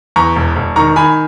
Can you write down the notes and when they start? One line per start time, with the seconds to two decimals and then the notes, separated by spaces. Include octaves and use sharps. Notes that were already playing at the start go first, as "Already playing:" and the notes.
0.16 E2 A#5 C#6
0.36 E1
0.56 E1
0.76 D#3 A#5 C#6
0.96 D#3 G#5 B5